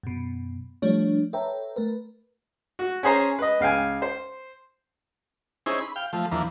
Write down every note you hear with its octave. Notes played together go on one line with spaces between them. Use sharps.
F#2 B2
F3 G3 A3 D4 C#5
A4 B4 C#5 E5 G5 A#5
A3 A#4 B4
F#4
C#4 G#4 C5 A#5
B4 D#5
C#2 F5 G5 G#5
C5
C#4 D#4 E4 G#4 C5
B5
F5 G5
F3 A3
E2 E3 F3 A#3 D4